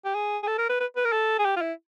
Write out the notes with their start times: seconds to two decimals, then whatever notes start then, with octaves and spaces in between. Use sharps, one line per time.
0.05 G4
0.15 G#4
0.43 G#4
0.47 A4
0.59 A#4
0.69 B4
0.80 B4
0.96 B4
1.05 A#4
1.13 A4
1.39 G#4
1.45 G4
1.56 F4
1.62 E4